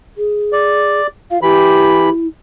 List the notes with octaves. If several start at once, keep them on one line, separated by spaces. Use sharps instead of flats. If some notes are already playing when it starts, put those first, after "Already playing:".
G#4
D5
F4 F5
E3 E4 G4 B5